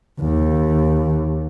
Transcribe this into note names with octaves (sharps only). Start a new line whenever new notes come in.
D#2